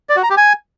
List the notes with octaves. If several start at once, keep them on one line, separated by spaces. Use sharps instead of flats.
D5
F#4
A#5
G4
G#5